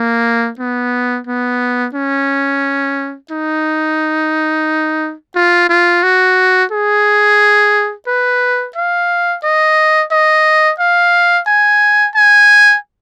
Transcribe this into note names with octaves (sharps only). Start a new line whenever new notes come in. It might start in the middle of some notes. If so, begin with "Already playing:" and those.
Already playing: A#3
B3
B3
C#4
D#4
F4
F4
F#4
G#4
B4
F5
D#5
D#5
F5
G#5
G#5